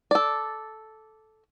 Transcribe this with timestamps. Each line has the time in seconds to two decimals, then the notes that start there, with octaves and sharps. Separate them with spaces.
0.11 A4 D5